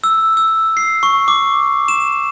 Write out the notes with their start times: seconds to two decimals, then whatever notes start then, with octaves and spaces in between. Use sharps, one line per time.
0.04 E6
0.37 E6
0.77 C7
1.03 C#6
1.28 D6
1.88 E7